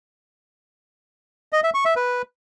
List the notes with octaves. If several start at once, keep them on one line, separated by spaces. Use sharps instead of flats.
D#5
E5
C#6
E5
B4